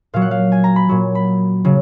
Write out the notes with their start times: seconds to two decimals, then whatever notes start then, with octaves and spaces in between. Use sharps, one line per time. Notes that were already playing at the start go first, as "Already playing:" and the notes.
0.13 A#2 F#3 F5
0.22 F#5
0.31 F5
0.52 G#5
0.64 A#5
0.76 B5
0.89 A#2 F#3
1.15 B5
1.65 C#3 F#3